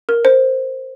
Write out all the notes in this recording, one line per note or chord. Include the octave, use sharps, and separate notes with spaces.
A#4
C5